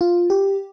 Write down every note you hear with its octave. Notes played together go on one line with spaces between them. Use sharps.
F4
G4